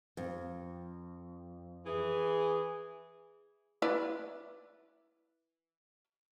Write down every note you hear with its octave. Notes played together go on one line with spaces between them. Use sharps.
F2
E3 G#4
E4 B4 D5